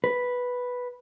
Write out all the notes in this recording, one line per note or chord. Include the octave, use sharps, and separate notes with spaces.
B4